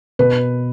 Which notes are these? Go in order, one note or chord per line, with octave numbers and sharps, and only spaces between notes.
B2 B4